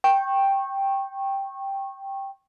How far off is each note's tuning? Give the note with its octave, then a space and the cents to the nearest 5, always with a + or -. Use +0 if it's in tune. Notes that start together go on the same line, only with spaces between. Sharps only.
G5 +0 C#6 -25